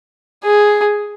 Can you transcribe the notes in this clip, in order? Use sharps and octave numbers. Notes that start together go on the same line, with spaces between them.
G#4